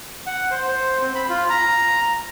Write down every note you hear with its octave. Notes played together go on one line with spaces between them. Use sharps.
F#5
C5
C5
C4
B5
F4
A#5